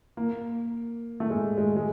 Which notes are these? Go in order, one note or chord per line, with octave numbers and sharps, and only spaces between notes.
A#3
A3
G#3
G#3
G#3